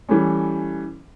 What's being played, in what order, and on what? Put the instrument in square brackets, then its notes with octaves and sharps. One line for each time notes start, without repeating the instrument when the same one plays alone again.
[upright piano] E3 G3 A3 C#4